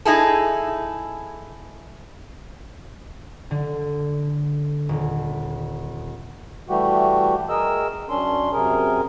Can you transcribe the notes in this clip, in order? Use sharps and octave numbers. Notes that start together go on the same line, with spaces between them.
D#4 E4 G#4 A4
D3
D#1
E3 G3 A3 F#4 G4
G#4 A#4 D#5 E6
F#2 C#4 D4 C6
F#2 C3 G#4 A#4